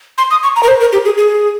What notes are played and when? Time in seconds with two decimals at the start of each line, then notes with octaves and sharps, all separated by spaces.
0.18 C6
0.31 D#6
0.43 C#6
0.56 A#5
0.63 A#4
0.68 C5
0.81 A#4
0.93 G4
1.05 G#4
1.18 G#4